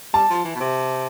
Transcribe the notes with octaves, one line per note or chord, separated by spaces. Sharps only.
G3 A5
F3
E3
B2
C3